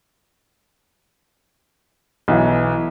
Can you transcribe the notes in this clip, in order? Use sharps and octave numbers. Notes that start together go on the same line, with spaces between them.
B1 E3